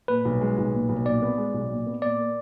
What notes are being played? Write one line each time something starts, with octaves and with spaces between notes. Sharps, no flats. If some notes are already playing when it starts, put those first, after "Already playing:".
A#2 B4
B1
G#3
B1
A#2
B1
A#2 D5
B3
G#3
B1
A#2
B3
A#2 D5
A#3